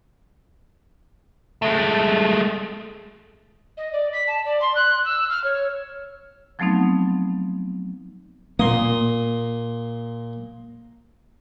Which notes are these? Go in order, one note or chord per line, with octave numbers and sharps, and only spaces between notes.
G#3 A3
D#5
D5
B6
A5
D5
C6
F#6
E6
F6
C#5
F3 F#3 A3 B3 C4 D#4
A#2 A#3 C6 D#6